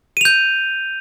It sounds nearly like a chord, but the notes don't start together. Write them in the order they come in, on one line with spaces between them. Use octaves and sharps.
D#7 F7 G6